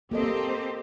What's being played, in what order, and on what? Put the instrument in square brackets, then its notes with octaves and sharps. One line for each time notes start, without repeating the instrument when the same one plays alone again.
[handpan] A#3 A4 D#5 [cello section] C4 G4